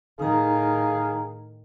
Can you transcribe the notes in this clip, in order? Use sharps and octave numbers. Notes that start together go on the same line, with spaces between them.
A2 D#3 D#4 G#4 F5 A#5